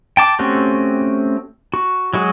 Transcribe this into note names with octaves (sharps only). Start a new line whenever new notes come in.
G5 A5 D6
A3 C4 C#4 F#4 G4
F#4
F#3 G#3 F#4 G#4